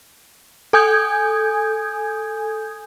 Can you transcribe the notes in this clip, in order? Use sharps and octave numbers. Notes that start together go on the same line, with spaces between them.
A4 G#5 D#6 G6 G#6